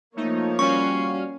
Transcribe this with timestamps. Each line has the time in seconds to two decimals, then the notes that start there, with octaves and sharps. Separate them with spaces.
0.17 F3 A3 A#3 D#4 C#5
0.59 G3 C#4 F#4 F5 C#6